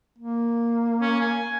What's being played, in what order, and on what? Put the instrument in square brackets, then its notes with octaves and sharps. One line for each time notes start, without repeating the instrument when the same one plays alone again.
[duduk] A#3
[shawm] C#4
G#5